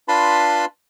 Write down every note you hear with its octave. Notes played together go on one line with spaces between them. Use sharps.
D4 F4 B4 A5 B5 C6